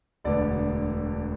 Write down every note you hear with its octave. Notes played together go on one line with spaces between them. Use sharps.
E1 D2 D3 B3 D5